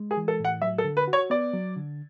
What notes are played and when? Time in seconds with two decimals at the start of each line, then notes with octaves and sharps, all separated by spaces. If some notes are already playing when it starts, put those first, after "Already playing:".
Already playing: G#3
0.11 G#4
0.17 E3
0.28 A4
0.40 A2 F#5
0.62 F#3 E5
0.78 A4
0.84 D3
0.97 B4
1.08 F#4
1.13 C#5
1.30 B3 D5
1.53 F#3
1.76 D3